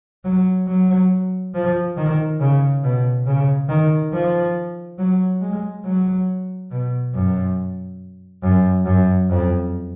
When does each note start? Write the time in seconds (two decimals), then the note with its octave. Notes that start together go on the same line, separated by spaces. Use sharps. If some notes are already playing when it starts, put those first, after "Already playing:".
0.24 F#3
0.68 F#3
1.55 F3
1.97 D#3
2.40 C#3
2.84 B2
3.27 C#3
3.69 D#3
4.13 F3
4.99 F#3
5.41 G#3
5.85 F#3
6.71 B2
7.14 F#2
8.43 F#2
8.86 F#2
9.30 F2